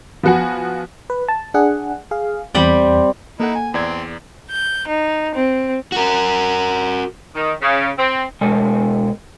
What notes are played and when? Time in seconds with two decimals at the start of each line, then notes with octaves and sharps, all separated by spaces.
0.23 F3 B3 F#4 F#5 G#5
1.10 B4
1.28 A5
1.54 D4 G#4 F#5
2.11 G#4 F5
2.55 E2 G3 C4 B5
3.40 A#3 D#4 E4 A4 F#5
3.55 G#5
3.74 E2 C4 D5 G#6
4.50 G6
4.87 D#4
5.34 C4
5.92 F#4 A#4
7.35 D#3
7.61 C#3
7.98 C4
8.41 B2 G#3 C#5 G#5